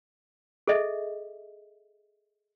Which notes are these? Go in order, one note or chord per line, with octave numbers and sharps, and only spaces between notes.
G#4 A4 D#5 E5